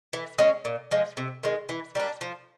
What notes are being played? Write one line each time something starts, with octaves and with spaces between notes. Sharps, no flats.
E3
G#3 C#4
A#2
F3 G#3
C3
D#3 G#3
E3
G3 A#3 D4
F3